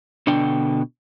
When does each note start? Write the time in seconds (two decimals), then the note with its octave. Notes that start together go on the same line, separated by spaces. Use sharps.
0.27 B2 D3 D4 G5